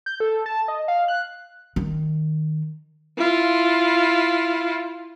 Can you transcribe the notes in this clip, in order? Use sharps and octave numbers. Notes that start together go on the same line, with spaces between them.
G6
A4
A5
D#5
F5
F#6
D#3
E4 F4